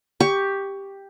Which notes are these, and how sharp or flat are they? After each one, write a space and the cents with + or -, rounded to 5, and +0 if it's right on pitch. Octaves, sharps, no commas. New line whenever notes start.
G4 +5 C#6 +15